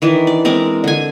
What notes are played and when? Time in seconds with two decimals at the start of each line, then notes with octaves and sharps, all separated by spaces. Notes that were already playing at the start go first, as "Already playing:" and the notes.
0.02 D#3 E3 D4
0.27 D5
0.45 G#3 C4 A#4 D6
0.84 D3 G#5